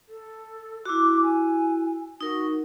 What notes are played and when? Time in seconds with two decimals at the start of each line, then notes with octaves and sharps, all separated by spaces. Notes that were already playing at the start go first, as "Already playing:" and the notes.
0.09 A4
0.85 E4 F#4 D6
1.22 G#5
2.21 D#4 F#4 A#4